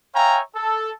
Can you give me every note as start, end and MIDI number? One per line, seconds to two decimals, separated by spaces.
0.15 0.40 73
0.15 0.40 76
0.15 0.40 77
0.15 0.40 79
0.15 0.40 80
0.15 0.40 82
0.56 0.91 69